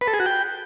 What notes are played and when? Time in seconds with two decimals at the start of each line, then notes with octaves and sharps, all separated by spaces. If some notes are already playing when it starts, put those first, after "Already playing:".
0.01 B4
0.07 A4
0.14 G#4
0.20 F#4
0.26 G5